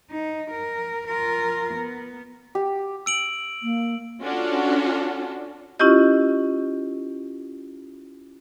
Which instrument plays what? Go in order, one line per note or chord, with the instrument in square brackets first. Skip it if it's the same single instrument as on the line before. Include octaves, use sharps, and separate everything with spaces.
[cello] D#4
A#4
F4 A#4
B3
[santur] G4
[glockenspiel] E6 D7 F#7
[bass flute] A#3
[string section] C#4 D4 F4 F#4 A4
[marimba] C#4 E4 F4 G4 D#5